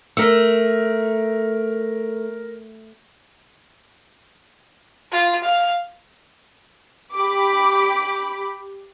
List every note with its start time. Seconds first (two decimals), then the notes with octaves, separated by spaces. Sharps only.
0.17 A3 A#4 E6
5.12 F4
5.44 F5
7.14 G4 B5 D6